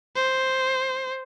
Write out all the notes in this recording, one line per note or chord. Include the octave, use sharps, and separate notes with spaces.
C5